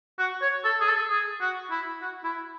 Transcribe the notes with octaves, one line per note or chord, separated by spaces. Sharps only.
F#4
C#5
A4
G#4
A4
G#4
F#4
E4
F#4
E4